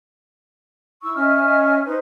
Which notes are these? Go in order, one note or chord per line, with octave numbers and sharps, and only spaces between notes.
E4 C#6 E6
C#4 D#5 E5 F6
D#4 B4 C5